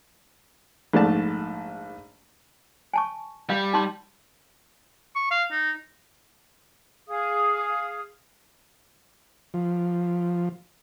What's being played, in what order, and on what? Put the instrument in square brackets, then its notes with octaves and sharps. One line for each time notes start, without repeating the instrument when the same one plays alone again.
[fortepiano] A#1 G#2 A3 D5 A5
[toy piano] G#5 A5 C#6
[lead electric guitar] G3 [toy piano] F5
[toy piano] D#4 A5 C6
[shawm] C#6
F5
D#4
[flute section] G#4 F5 D#6
[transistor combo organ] F3